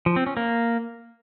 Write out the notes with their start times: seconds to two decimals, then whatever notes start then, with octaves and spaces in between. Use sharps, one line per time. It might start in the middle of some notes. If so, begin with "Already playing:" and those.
0.06 F3
0.16 C4
0.26 C#4
0.37 A#3